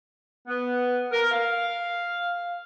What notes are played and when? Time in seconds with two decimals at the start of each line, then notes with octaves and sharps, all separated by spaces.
0.48 B3
1.12 A#4
1.32 F5